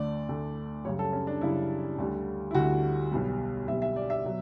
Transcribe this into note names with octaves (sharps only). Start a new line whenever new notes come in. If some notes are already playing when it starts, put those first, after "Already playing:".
Already playing: D2 D3 A3 D5
D2 D3 A3
F#2 C#3 G3 C#5
A4
C#4
D4
F#2 C#3 G3 E4
D2 D3 G3
E4
D2 D3 G3 F#4
B1 B2 G3
B1 B2 G3 E5
E5
D5
E5
B2 F#3